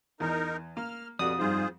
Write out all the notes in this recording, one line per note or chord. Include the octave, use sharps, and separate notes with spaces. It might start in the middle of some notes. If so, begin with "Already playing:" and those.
E2 D#4 A#4
A#3 F6
F2 B2 F#4 G4 A4 D5 D#6
G2 G3 D#4 F4 G#4 C5